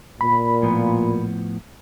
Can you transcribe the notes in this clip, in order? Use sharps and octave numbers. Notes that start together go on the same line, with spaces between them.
A#2 B5
A2 F3 B3